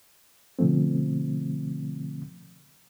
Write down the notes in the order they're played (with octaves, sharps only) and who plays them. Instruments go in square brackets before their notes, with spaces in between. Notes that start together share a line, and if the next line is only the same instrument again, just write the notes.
[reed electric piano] B2 D3 F3 A3 C4